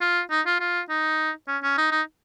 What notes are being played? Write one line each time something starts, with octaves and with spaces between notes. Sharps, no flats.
F4
D#4
F4
F4
D#4
C#4
C#4
D#4
D#4